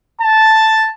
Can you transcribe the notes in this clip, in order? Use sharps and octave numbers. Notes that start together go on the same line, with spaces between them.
A5